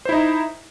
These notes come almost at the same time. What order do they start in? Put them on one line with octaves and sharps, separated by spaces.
C5 E4 D#4